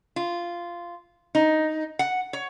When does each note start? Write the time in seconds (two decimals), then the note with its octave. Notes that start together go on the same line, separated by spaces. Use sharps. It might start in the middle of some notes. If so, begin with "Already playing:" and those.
0.16 F4
1.35 D#4
1.99 F#5
2.33 C#5